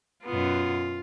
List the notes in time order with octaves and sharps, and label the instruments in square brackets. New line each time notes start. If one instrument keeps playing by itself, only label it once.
[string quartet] F#2 B2 B3 [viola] F4